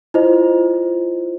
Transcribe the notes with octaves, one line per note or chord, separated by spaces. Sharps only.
E4 F4 C5 D#5